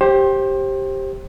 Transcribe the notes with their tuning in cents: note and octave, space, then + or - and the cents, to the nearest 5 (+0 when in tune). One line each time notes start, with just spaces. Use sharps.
G4 +0 C5 +25